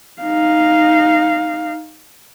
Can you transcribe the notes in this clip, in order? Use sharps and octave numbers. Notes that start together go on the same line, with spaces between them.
D#4 F5